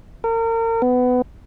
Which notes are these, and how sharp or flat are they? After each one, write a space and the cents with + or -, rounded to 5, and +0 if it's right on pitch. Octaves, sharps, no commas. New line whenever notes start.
A#4 -35
B3 +20